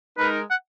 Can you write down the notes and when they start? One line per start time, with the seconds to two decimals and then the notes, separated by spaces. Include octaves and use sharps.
0.18 G#3 D#4 A#4 B4
0.50 F#5